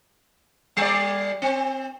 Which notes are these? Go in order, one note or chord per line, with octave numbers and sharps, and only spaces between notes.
G3 D5
C4